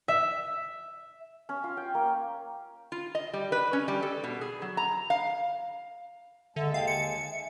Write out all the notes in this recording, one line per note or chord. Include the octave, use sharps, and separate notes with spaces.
E5
C#4
F4
G5
A#3
F4
D#5
G3
B4
C#4
G3
A4
B2
G#4
F#3
A#5
F5
D#2 D3 G#3 E5 A5
F5 G5
G#5 C#7
G#5
E5